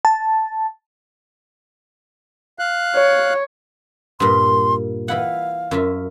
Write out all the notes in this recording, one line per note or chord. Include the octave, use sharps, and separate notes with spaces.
A5
F5 F#6
C#5
G2 A#2 C6
E3 E4 F5 F#5
F#2 F4 E5